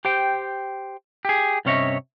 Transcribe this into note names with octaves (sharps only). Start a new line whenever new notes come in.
G4 C5 G5
G4 G#4
G2 C3 C#4 C#5 D#5 E5